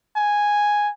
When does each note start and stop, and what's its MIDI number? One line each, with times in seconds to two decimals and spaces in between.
0.17 0.90 80